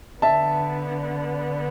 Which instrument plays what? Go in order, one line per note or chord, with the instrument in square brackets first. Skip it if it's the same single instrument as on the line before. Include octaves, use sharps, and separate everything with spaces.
[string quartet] D3 B3 D4 [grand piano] E5 A5